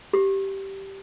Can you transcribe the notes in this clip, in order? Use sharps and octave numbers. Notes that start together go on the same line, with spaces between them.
G4